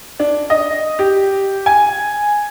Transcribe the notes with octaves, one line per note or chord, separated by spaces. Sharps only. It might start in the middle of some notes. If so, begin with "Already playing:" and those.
D4
D#5
G4
G#5